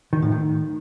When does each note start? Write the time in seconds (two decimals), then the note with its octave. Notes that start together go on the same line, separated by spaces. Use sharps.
0.13 D#3
0.22 A2
0.32 D#3